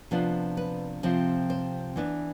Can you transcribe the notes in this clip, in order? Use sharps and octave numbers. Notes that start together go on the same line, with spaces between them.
C3 F3 B3 D4
B4
C3 F3 C4
C5
E3 B3 D4